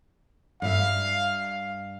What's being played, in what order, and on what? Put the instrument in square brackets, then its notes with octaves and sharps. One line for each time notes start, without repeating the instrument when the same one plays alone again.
[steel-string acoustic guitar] G2 E5 [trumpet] F5